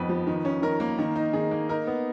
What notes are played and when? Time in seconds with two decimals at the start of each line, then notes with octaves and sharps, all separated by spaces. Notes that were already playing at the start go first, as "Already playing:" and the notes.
Already playing: F2 B3 D#4 B4
0.09 F3
0.27 D#3
0.45 C#4
0.62 D#3 A#4
0.80 A#3
0.98 D#3
1.15 D#4
1.33 D#3 G#4
1.51 A#3
1.69 D#4 A#4
1.87 B3